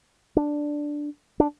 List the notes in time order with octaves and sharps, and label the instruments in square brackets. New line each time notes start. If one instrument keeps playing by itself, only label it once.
[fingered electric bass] D4
D4